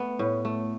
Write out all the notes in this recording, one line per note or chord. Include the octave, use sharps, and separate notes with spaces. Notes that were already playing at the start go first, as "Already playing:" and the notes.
Already playing: A3 B3
A2
A3